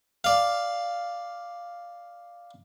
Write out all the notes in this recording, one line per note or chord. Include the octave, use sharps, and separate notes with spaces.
D5 F5